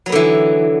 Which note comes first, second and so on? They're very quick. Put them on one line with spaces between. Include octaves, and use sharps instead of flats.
F#3 B3 D3 E3